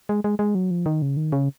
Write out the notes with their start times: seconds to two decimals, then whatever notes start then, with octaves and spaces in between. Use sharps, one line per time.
0.09 G#3
0.24 G#3
0.39 G#3
0.55 F#3
0.71 F3
0.86 D#3
1.02 C#3
1.17 D#3
1.32 C#3